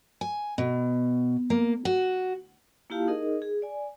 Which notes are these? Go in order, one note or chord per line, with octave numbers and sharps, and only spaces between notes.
G#5
B2
A#3
F#4
A#3 E4 F4 G4 F5 A5
D#4 G#4 A#4 D#5
G#4
D5 G#5